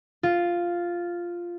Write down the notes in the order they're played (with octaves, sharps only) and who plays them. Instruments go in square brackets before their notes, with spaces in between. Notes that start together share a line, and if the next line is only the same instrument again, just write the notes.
[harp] F4